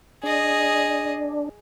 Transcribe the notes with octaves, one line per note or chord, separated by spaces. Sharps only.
D4 G#4 D#5